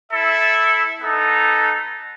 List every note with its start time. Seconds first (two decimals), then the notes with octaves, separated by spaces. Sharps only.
0.11 E4 A4 E5
1.02 B3 D#4 A4